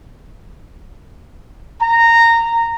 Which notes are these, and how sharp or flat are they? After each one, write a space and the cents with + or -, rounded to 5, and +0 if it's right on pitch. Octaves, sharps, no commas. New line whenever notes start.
A#5 -15